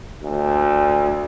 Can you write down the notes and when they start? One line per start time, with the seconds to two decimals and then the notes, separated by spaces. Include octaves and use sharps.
0.23 D2